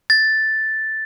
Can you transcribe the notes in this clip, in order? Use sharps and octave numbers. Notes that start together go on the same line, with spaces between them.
A6